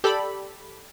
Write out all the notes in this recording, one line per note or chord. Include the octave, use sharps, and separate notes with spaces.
G4 A4 D5 B5